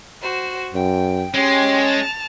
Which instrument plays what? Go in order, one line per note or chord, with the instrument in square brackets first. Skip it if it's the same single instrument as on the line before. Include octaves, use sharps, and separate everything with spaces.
[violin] F#4 C5
[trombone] F#2 [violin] G5
[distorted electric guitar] G#3 [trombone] C#4 [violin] G4 C6
[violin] A5 F7